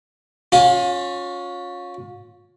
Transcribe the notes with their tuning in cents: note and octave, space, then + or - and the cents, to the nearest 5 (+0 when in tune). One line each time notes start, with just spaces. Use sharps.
C#4 +0 F4 +35